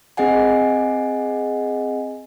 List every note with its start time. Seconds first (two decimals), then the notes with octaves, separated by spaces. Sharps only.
0.17 C4 G#4 D#5 F#5 G#5